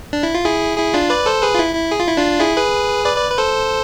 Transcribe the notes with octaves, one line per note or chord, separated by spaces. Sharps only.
D4
E4
F4
E4 G#4
E4 G#4
D4 F4
B4 D5
A4 C5
G#4 B4
F4
E4
E4
G#4
F4
E4
D4 F4
E4 G#4
G#4 B4
B4 D5
B4 D5
B4
A4 C5